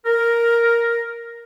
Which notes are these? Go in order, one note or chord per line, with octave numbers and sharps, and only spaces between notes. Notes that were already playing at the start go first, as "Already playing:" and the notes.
A#4